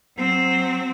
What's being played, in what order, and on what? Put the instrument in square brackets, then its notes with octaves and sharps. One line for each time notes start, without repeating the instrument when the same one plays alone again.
[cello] F#3 C4